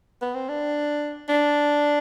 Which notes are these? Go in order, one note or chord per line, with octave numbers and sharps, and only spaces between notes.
B3
C4
D4
D4